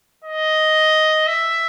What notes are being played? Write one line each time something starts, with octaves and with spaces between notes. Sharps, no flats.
D#5
E5